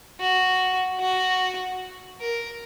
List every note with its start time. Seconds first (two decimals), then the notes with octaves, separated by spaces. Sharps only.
0.20 F#4
1.00 F#4
2.20 A#4